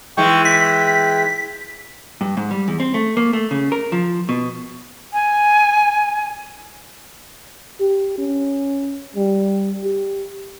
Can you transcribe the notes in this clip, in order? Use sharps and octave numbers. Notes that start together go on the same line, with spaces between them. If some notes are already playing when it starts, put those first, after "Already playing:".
E3 G#3 G5 C#6
G5 B6
G2
G#2
G3
E2
C4
A3
A#3
A3
C#3
A#4
F3
B2
G#5
G4
C#4
G3
G4